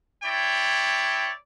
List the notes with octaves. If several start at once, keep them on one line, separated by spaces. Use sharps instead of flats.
E4 C#5 D5 G5